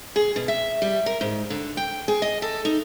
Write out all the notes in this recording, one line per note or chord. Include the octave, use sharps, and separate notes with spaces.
G#4
B2
E5
G3
A#4
G#2
D3
G5
G#4
D#5
A4
D#4